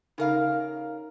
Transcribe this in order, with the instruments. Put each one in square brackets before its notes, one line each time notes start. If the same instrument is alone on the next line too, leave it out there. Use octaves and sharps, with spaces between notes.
[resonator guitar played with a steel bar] C#3 A#4 F5 [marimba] D#4